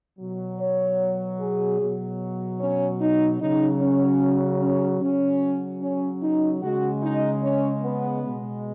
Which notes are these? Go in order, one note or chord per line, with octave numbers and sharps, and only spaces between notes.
B2 F#3
C#5
G#4
B2 F#3
C#4
D#4
C#3 F#3 D#4
C#4
C#4
C#3 F#3 C#4
C#4
D#4
C#3 G#3 F#4
D#4
C#4
B3
B2 G#3